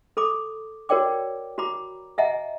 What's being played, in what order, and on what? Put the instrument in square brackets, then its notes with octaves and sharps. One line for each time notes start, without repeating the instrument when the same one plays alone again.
[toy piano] A4 B5 D6
F#4 A#4 C#5 D5 G5 D6
F#4 A#5 B5 D6
D#5 E5 F#5 G#5 A#5